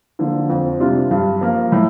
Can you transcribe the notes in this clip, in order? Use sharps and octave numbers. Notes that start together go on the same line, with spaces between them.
D3 F3 A#3
F2
C3 G3 D4 F4
G2
F3 A#3
A2